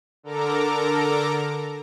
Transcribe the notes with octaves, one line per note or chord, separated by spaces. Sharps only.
D3 A4 A#4 A#5 D6